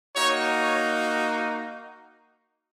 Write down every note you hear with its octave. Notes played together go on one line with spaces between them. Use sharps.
A#3 D#4 F#4 C#5
C#5